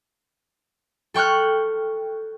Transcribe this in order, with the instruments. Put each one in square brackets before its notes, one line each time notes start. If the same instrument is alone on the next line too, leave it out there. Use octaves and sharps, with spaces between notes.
[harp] A4 G5 C#6 F6 F#6